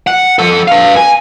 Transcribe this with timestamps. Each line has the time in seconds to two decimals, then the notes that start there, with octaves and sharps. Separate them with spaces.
0.07 F#5
0.39 F3 A4
0.68 B4 F5
0.96 G#5